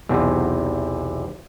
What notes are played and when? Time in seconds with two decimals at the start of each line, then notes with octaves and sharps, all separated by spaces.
0.09 B1 E2 C3